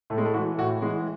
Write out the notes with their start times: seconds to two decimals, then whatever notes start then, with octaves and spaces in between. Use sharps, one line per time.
0.10 A2 A3
0.18 G#3
0.25 A3
0.34 E3 F#4
0.58 A2 F#4
0.82 E3 G#3